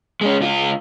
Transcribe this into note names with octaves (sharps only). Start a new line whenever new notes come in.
G#3 C#4
C#2 F4